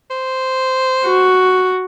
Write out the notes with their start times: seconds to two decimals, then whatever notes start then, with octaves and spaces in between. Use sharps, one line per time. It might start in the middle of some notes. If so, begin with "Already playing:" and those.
0.11 C5
1.06 F#4